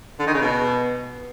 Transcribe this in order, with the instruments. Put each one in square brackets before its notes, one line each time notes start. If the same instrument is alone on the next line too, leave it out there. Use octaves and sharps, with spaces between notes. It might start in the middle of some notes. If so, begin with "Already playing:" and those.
[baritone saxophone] D3
D#3
C#3
B2